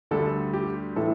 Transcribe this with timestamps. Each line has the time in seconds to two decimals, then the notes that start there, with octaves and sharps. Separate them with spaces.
0.11 D2 D3 G3 A4
0.54 G4
0.96 A2 E3 A4